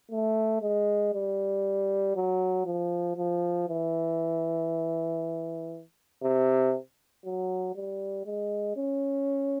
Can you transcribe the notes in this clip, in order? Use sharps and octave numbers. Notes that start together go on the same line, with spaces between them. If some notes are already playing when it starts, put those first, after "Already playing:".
A3
G#3
G3
F#3
F3
F3
E3
C3
F#3
G3
G#3
C#4